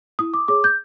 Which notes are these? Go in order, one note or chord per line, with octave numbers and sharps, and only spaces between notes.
E4 D#6
D6
G#4 C#5 D6
G6